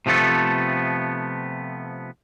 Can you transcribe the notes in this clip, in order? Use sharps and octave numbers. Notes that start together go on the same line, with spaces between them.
C3 F3 A3 B3 A4